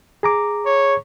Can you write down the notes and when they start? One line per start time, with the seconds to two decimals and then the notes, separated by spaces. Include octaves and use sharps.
0.23 G#4 A#5 D6
0.65 C#5